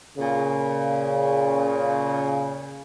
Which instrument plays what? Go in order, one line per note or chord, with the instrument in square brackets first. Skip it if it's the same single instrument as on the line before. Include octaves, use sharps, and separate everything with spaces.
[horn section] A#2 C#3